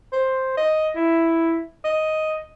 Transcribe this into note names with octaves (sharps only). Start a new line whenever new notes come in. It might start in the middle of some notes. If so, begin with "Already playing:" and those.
C5
D#5
E4
D#5